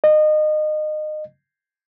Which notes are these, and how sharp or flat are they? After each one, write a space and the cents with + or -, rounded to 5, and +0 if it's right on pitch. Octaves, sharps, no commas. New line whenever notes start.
D#5 -25